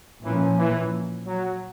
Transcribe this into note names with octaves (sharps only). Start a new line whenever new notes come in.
A#2 E3 F3 A#3 C#4
E3
F#3